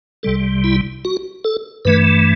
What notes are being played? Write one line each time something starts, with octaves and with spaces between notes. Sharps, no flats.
C2 C3 G3 A4
E4
F#4
A4
G2 E3 A3 B4